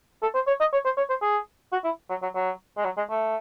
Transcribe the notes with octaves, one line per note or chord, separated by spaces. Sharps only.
A4
C5
C#5
D#5
C#5
C5
C#5
C5
G#4
F#4
E4
F#3
F#3
F#3
G#3
F#3
G#3
A3